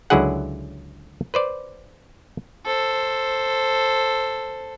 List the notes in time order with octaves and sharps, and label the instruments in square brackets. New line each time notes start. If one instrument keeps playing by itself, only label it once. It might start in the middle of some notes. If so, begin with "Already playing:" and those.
[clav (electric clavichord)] C#2 D3 F#3 E4 G#4 F#5
B4 C5 D5
[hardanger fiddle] A4 C5